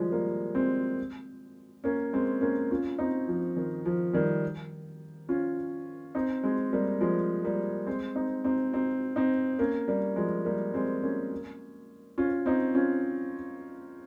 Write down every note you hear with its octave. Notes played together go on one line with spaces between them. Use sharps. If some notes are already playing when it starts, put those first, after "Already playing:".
Already playing: D#3 F3 G3 G#3
G3 A#3
G#3 C4
A#3 C#4
G#3 C4
A#3 C#4
C#4 F4
C4 D#4
F3
D#3
F3
D#3 G3
C#4 F4
C4 D#4
G#3 C4
G3 A#3
F3 G#3
G3 A#3
G#3 C4
C4 D#4
C4 D#4
C4 D#4
C4 D#4
A#3 C#4
G3 A#3
F3 G#3
G3 A#3
G#3 C4
A#3 C#4
C#4 F4
C4 D#4
C#4 F4